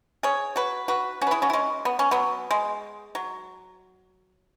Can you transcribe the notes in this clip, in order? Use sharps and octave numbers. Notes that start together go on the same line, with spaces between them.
G#4 C#5
F#4 B4
F#4 B4
C#4 F#4
B4
E4 G#4
C#4 F#4
E4
G#3 C#4
B3
C#4
F#3 B3
G#3
F#3